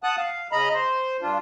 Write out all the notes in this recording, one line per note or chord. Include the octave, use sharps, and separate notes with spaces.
F#5 A5 D#6 F#6
F5
C#3 D#5 A#5 B5
C5 C6
G2 D4 F4